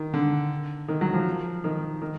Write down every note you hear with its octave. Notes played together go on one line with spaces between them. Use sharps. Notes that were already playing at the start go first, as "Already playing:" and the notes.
Already playing: D#3
D3
D#3
F#3
F3
D#3
D#3